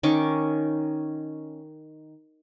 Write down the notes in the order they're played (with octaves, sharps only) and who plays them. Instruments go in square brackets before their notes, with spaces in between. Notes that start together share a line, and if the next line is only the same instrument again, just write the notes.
[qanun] D#3 C#4 C#6 D6